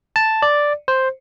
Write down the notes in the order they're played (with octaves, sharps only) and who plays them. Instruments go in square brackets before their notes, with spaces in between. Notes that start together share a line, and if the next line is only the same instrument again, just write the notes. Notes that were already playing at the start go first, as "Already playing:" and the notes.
[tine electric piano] A5
D5
C5